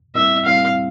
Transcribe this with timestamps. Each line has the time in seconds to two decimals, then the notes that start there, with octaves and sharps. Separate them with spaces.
0.14 A2 G3 C4 E4 E5
0.45 A2 G3 C4 E4 F5